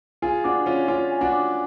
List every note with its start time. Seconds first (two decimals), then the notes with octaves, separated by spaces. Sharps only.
0.22 F4 G#4 G#5
0.44 D4 F#4 D6
0.66 C#4 F4 C#5
0.88 C#4 F4 C#5
1.10 G#5
1.21 D4 F#4
1.32 D6